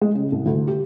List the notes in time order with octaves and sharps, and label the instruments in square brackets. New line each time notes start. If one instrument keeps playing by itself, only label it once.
[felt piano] G#3
C#3
C2
D2
G4